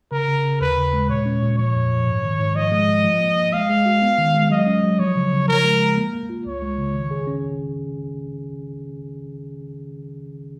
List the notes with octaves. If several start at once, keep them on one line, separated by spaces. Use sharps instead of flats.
C#3 A#4
C#3
C#3
D#2 B4
C#3
G#3
A#2 C#5
C#4
A#2
F3 C#5
F2
F3
G#2
D#3
G#2
F3 D#5
G#3
F3
F3
A#3
A#3
G#3 F5
G#3
F#4
B3
D#3
G#3
F#3 D#5
C#4
F#3
F3 C#5
C#3
C#3
F3 A#4
G#3
G#3
A#3
A#3
F4
C#2 C#5
G#3
C#3
D#3
G#4
C#4